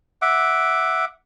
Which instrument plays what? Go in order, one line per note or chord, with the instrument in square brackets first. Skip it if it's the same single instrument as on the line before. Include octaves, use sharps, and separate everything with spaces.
[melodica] E5 F#5 D6